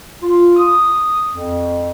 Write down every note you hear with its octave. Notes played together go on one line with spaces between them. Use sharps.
F4
D#6
F2